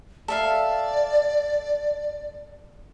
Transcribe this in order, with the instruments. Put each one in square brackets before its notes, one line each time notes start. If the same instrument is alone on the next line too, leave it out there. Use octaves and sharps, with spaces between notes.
[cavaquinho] A4 E5 F5 [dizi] D5